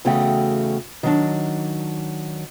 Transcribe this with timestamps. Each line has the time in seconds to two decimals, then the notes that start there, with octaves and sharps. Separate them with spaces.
0.05 E2 C#3 A3 F#4 G5
1.03 D#3 F#3 D4